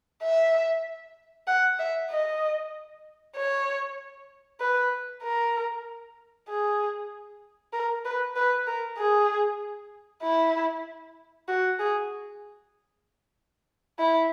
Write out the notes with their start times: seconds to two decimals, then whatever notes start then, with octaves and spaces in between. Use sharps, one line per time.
0.23 E5
1.48 F#5
1.79 E5
2.11 D#5
3.36 C#5
4.60 B4
5.23 A#4
6.49 G#4
7.73 A#4
8.05 B4
8.36 B4
8.67 A#4
8.99 G#4
10.23 E4
11.48 F#4
11.79 G#4
13.99 E4